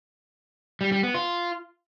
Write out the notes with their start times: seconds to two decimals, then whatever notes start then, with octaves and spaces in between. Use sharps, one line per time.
0.81 G3
0.92 G3
1.03 B3
1.15 F4